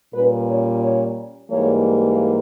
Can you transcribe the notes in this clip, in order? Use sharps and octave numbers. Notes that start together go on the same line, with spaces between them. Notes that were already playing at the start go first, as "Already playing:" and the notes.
A#2 G3 C#4 B4
C#5
C#5
G#2 E3 G3 A#3 C#5